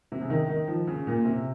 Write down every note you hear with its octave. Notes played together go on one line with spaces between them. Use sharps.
C3
C#3
D#3
D#3
F3
C#3
A#2
C3